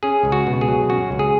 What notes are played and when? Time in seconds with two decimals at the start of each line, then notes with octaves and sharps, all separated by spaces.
0.03 C#4 G#4
0.25 C#2
0.32 F#4
0.47 B2
0.61 G#4
0.68 F#3
0.90 C#4 F#4
1.12 C#2
1.19 G#4